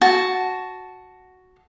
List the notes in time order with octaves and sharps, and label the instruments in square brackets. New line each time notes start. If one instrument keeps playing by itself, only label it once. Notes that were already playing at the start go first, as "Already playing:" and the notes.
[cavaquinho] F#4 A5